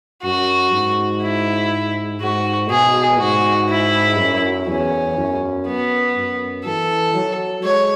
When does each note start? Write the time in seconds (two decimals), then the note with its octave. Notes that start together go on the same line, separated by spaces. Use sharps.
0.23 F#2 F#4
0.73 G#2
1.22 E4
2.21 G#2 F#4
2.70 B2 G#4
3.20 G#2 F#4
3.70 E4
4.18 F#2
4.68 E2 C#4
5.18 F#2
5.67 B3
6.16 F#2
6.65 E3 A4
7.14 F#3
7.64 G#3 C#5